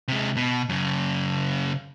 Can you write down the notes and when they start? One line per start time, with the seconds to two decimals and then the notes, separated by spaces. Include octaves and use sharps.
0.08 C3 G#3
0.37 B2
0.69 F#2 C#3